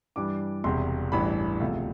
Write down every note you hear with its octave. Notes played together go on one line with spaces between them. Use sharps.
G2 E3 G3 D4 D6
E1 E2 C3 C6
A1 G2 E3 B5
E1 D2 C3 F3 A3 F5